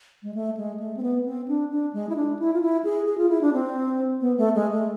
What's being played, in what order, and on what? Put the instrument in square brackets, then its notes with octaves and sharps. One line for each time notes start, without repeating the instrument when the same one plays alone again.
[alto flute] G#3
A3
G#3
A3
C4
B3
C4
D4
D4
G#3
E4
D4
E4
F4
E4
G#4
G#4
F4
E4
D4
C4
B3
A3
G#3
A3